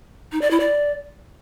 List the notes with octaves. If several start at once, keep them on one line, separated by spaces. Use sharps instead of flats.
D#4
D5
E4
D5